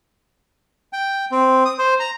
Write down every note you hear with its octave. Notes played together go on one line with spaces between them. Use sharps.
G5
C4
D#6
C5
A#5